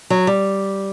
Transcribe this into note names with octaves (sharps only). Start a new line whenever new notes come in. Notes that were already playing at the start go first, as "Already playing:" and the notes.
F#3
G3